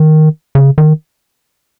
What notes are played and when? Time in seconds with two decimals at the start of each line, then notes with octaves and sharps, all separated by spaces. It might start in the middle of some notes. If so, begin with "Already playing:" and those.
Already playing: D#3
0.55 C#3
0.78 D#3